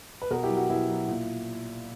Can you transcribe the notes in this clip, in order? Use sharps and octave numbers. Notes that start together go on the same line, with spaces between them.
B4
B2 F#4 A#4
E4 G4
F#3
F#4
B2 E4
F#3
A#2